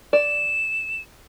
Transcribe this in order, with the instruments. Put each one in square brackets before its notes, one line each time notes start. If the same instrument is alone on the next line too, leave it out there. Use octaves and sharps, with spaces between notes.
[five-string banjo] D5 [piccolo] E7